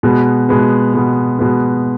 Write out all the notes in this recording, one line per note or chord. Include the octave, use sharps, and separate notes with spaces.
B2 G#3 B3
B2 G#3 B3
B2 G#3 B3
B2 G#3 B3